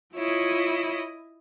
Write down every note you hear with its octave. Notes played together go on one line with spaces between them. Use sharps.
E4 F4 C#5 D#5